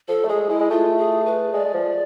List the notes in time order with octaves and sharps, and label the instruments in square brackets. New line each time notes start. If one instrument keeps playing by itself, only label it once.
[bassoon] F3 [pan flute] A4
[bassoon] A3
[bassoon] G#3 [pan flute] G#4
[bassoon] G#3 [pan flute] E4
[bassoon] G#3
[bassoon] A3 [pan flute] F4
[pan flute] G#4
B4
[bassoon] G#3 [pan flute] D5
[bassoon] G#3
F3